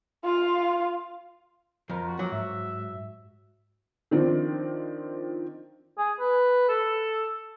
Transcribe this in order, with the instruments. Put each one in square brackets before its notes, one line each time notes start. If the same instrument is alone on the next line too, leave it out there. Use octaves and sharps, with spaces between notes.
[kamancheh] F4 F5
[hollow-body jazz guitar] F2 [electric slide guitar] F3 [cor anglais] A#4
[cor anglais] F#4
[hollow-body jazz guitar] F#3 [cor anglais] A#3
[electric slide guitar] G#2 [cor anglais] E5
[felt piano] D#3 F3 C4 D4
[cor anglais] G#4
B4
A4